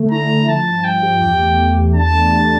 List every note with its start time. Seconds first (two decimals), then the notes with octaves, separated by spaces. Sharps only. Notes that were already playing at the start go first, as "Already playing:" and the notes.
Already playing: D3 A3
0.11 E4 A#5
0.29 D3
0.48 F3 A5
0.66 G2
0.84 F3 G5
1.03 G4
1.21 E2
1.39 A3
1.57 E3
1.76 E2
1.94 D4 A5
2.12 A3
2.31 G4